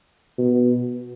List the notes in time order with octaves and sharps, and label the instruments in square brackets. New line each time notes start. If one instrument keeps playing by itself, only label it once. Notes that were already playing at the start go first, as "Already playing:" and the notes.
[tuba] B2